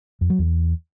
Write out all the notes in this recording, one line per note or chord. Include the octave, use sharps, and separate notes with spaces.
F2
F#3
E2